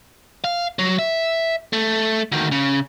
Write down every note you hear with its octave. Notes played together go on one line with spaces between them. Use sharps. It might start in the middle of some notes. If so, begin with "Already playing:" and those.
F5
F#3
E5
A3
D2 D#3
C#3